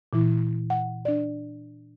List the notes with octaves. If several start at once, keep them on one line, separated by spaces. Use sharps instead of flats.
A#2 E3 E4
F#5
D4 D5